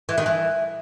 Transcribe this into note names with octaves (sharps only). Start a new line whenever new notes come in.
E3
D#3
E3